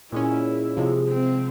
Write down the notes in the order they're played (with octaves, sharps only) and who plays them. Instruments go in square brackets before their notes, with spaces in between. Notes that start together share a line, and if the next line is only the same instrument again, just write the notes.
[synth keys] A#2 G#3 C#4 [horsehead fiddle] E4
[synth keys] C3 F3 G#3
[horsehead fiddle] C4